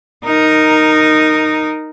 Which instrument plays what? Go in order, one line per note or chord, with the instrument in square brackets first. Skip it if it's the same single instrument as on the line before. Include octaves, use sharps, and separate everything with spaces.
[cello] D#4 A#4